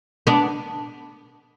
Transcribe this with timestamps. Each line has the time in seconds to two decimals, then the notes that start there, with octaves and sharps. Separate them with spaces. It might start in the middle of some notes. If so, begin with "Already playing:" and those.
0.27 B3 D4